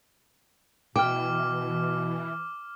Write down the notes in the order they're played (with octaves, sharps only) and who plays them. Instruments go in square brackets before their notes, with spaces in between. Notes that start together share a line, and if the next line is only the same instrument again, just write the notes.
[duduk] B2 [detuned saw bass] E3 [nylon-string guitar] G5 [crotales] D6 F6